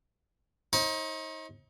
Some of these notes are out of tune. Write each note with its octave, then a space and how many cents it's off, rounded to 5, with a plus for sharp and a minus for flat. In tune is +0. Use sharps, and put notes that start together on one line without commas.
D#4 +30 C5 +45